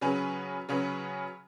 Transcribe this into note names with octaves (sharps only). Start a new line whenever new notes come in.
C#3 F#3 C#4 G#4 B4
C#3 F#3 C#4 G#4 B4